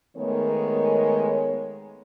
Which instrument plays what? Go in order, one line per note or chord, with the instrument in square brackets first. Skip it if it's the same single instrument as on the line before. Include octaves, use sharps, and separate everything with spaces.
[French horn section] D#3 G#3 A3 B3 A#4 C#5